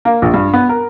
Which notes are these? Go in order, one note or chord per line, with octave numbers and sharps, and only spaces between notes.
A#3
A#1
G2
B3
A#4